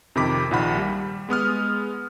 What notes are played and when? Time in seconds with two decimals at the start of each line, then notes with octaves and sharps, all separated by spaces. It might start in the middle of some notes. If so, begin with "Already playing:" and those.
0.15 F2 C3 D#3 B5 D6 B6
0.51 A#1 A#2 D#3 F#5 B5
0.77 G3
1.29 G#3 B3 D#6 F6